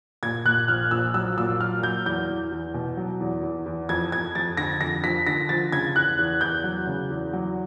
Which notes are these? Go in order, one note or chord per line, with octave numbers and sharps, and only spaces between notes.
A#2 G#6
A#2 F#6
A#1 F6
A#1 E6
F#3 E6
A#2 E6
F#3 F6
F#3 G6
E2 G6
E2
E2
B2
F#3
E2
E2
E2
F2 G#6
F2 G#6
F2 A6
D3 A#6
F2 A#6
F3 B6
D3 A#6
F3 A6
C#3 G#6
E2 F#6
E2
E2 G6
F#3
C#3
E2
F#3